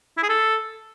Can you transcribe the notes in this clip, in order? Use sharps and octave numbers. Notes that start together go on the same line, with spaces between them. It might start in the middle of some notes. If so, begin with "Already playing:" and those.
E4
G#4
A4